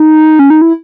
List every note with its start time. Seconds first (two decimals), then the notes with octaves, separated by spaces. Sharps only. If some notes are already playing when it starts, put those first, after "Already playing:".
Already playing: D#4
0.39 C#4
0.50 D#4
0.62 E4